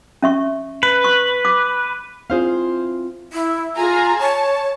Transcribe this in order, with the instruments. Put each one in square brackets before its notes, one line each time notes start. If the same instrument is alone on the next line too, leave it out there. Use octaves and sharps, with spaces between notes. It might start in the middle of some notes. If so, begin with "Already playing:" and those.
[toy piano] C#4 E5 C#6
[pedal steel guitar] B4
[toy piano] C#6
D6
[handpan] C4 E4 F4 [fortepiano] G#4 C5 F5
[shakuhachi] E4
[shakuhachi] F4 [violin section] G#4 G#5 A#5
[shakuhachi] C#5 [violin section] A5